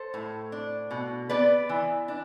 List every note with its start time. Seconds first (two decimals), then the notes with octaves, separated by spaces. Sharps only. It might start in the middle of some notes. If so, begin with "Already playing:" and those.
Already playing: A4 C5
0.14 A2
0.52 D4
0.91 B2
1.29 B3 B4 D5
1.69 E3
2.08 D4